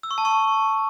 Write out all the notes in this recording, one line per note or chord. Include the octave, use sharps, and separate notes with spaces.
E6
C#6
A5
C#6